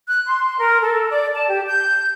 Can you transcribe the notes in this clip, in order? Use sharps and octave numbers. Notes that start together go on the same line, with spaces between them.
F#6
C6
A#4
A4
D5
A5
G4
G6